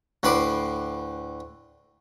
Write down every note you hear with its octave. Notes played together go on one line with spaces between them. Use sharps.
D2 A2 B4 B5 C6 D6